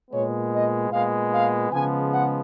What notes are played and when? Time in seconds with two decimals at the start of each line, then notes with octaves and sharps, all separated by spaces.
0.10 A#2 G#3 B3 C#5
0.51 D#5
0.91 A#2 G#3 B3 F5
1.32 F5
1.72 C#3 F3 G#3 B3 G#5
2.12 F#5